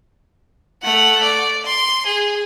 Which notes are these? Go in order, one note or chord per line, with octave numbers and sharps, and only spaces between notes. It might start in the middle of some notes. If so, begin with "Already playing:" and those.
A3 F#5
D5
C6
G#4